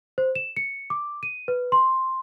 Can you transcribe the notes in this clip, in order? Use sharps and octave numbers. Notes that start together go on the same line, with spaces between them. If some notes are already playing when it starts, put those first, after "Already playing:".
C5
E7
C#7
D6
D#7
B4
C6